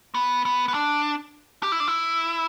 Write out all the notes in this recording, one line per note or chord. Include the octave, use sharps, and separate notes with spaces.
B3
B3
B3
D4
G4
E4
D4
E4